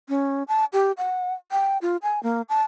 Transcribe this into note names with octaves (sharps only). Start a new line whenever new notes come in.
C#4
A5
G4
F#5
G5
F4
G#5
A#3
A5